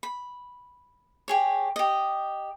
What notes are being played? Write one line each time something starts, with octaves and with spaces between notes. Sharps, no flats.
B5
G4 G#4 C#5
G4 D#5